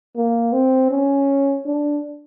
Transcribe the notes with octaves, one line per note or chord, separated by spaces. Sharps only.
A#3
C4
C#4
D4